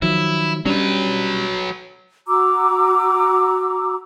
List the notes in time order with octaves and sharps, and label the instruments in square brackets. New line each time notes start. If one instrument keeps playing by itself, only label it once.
[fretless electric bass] D#3 F3 F#3 [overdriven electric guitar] E4
[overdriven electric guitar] F#3 B4 [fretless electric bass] G3 C#4 D4
[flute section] F#4 A#5 D6 E6